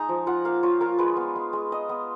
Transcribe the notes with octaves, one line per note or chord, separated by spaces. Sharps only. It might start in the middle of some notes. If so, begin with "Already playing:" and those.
Already playing: G#3 D#4 G#5 A#5
F3
F4 F#5
A#3 F5
F4 C#5
F4 A#4
G#3 B4
B3
G#3
G#3
G#3 D#5
B3